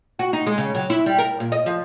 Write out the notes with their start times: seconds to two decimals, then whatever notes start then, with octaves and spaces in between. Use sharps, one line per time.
0.19 F#4
0.33 D#4
0.46 G#3
0.58 C#3
0.75 F#3
0.90 E4
1.06 G3
1.18 A#4
1.40 A#2
1.52 D#5
1.66 F3